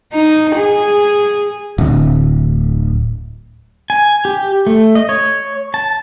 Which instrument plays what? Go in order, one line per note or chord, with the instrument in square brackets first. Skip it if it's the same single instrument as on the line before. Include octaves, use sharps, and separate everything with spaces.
[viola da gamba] D#4
G#4
[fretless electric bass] D1
[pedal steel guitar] G#5
G4
A3
D#5
C#5
A5